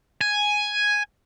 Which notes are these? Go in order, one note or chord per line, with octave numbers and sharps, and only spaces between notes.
G#5